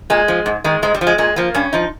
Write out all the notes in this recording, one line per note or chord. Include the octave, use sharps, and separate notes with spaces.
A#2 G#3
F3
G#2
D#3 G#3
G#2 G#3
G3
F3
G#3
A#2 G#3
F3 A#3
G2 C#4
F3 D#4